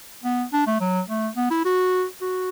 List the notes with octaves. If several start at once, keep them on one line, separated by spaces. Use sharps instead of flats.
B3
D4
A3
F#3
A3
B3
E4
F#4
F#4